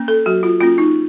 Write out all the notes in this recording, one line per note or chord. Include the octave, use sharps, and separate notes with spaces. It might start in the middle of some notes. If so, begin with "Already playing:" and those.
Already playing: A#3 C#4
A4
F#3 F#4
F4
A#3 C#4 F4
D#4